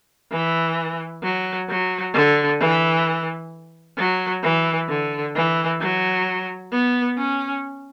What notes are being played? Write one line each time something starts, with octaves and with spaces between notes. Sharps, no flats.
E3
F#3
F#3
D3
E3
F#3
E3
D3
E3
F#3
B3
C#4